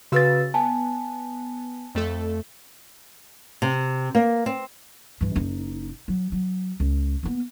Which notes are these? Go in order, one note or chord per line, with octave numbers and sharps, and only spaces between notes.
C#3 F#4 B4 F5 E6 A6
B3 G#5 A5
F2 A3 A4
C3
A#3
C4
G2 E3
F#1 D#4
F#3
F#3
C#2
A#3 B3